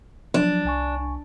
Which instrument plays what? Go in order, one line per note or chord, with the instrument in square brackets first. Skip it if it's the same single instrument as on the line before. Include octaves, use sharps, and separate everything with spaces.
[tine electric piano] F3 F#3 [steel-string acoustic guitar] D4
[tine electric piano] C2 G#5 C#6